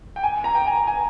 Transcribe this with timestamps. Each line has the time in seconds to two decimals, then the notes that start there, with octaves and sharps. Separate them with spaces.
0.16 G5
0.23 G#5
0.44 A#5
0.55 G5
0.67 G#5
0.87 G#5